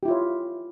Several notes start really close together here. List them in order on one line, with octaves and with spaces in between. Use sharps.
G4 E4 F4 C#5